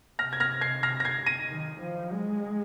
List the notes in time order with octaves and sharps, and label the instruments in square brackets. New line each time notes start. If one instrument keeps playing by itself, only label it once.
[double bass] C3 [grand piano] F6 A#6
[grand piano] G#6
F6 A#6
G#6 C7
F6 A#6
A#6
G#6 C7
A#6 D#7
[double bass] D#3
F3
G#3